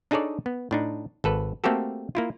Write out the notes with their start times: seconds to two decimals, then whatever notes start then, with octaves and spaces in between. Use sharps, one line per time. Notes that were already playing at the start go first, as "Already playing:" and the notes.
0.11 D4 D#4 G#4 A4 C#5 D5
0.46 B3
0.71 A2 D4 D#4
1.24 G#1 A4 B4
1.64 A3 A#3 C4 F#4 G4 A4
2.15 A#3 E4 F4